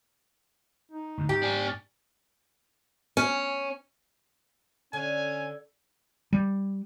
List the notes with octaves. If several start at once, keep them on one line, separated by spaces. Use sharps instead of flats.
D#4
D2 G#2 D3
G#2 G4
D4 G#5
C#4
D3 C#4 G#5
G3